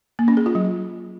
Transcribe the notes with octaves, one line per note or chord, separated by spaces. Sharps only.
A#3
C#4
G#4
F4
F#3